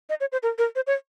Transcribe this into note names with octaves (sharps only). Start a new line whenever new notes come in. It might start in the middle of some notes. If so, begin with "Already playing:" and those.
D#5
C#5
C5
A#4
A#4
C5
C#5